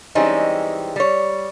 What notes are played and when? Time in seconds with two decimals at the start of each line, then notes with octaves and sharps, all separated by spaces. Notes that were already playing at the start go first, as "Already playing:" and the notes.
0.15 E3 G3 G#3 C4 C#4 D#4
0.96 G3 C#5